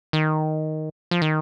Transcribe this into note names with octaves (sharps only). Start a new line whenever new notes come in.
D#3
F3
D#3